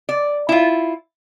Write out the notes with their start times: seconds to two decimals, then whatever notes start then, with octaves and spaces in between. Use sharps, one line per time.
0.09 D5
0.49 E4 F4